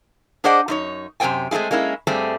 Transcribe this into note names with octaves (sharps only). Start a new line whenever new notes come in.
D4 G#4 C5 D5 D#5 F#5
F#2 D#4 C#5
F#2 C3 C#4 C5 G5 G#5
G#3 A3 C4 E4 G#4
G#3 A#3 C#4 E4
G2 G3 A3 C4 G#4